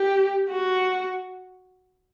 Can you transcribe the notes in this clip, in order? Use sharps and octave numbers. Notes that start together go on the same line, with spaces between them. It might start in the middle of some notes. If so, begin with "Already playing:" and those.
Already playing: G4
F#4